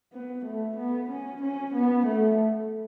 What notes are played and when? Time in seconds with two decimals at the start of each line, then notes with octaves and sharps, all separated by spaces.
0.12 B3
0.45 A3
0.77 B3
1.09 C#4
1.42 C#4
1.74 B3
2.06 A3